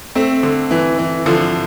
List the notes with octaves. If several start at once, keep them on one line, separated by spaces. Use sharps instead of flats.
A3 C4
D3
E3
E3
D3 F3